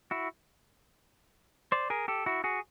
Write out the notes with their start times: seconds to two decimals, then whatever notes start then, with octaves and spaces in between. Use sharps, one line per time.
0.11 E4 F#4
1.72 C5 D5
1.90 G#4 A#4
2.08 G4 A4
2.26 E4 F#4
2.44 F#4 G#4